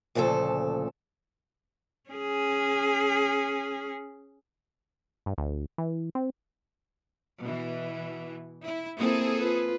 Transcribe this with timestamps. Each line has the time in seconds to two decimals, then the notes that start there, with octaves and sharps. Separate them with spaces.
0.15 D2 A#2 C#3 F3 A4
2.10 C#4 G#4
5.26 G2
5.38 D2
5.78 E3
6.15 C4
7.40 B2 E3
8.63 E4
8.99 A#3 C4 E4 G#4 A4
9.37 F4 B4